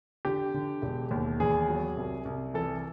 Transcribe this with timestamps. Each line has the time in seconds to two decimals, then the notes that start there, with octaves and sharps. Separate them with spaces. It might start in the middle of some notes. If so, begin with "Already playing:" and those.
0.25 D3 G4
0.54 D3
0.82 E1
1.11 D#2
1.40 E2 G#4
1.69 F#3
1.97 C2
2.25 C2
2.54 E3 A4